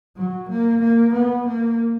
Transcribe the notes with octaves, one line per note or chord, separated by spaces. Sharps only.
F#3
A#3
A#3
B3
A#3